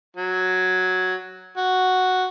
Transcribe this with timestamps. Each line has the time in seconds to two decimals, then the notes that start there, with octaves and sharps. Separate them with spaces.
0.17 F#3
1.57 F#4